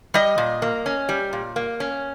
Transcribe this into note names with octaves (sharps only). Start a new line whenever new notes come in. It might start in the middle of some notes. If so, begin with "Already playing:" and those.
G3 D#5
A#2
A#3
C#4
G3
A#2
A#3
C#4